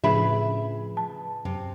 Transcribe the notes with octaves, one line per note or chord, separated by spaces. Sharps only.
A2 C#3 F3 D4 G#4 B4 E5 B5
A5
F#2 C3